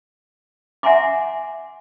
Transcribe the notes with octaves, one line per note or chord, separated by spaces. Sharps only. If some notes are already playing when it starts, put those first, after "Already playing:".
E5 F#5 G#5 A#5 C6 D6